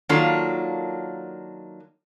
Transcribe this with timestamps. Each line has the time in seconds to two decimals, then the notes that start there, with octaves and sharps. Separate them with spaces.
0.09 D#3 F#3 A#3 D4 F4 A4